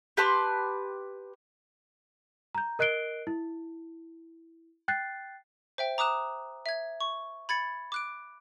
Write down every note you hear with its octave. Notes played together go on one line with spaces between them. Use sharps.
G4 B4 A5 C6
A#5 G6
A#4 D#5 F#6 C7 D7 G7
E4
G5 F#6 G6 A6 C7
C5 E5 G5
A#5 D6 D#6 F#6 E7
E5 G#6
C#6
B5 G#6 A6 C#7
D6 F#6 D7